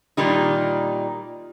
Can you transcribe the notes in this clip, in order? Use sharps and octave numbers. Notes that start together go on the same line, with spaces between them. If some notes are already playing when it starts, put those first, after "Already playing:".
A#2 D#3 G3 D#4